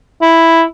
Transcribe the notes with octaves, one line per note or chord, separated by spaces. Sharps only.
E4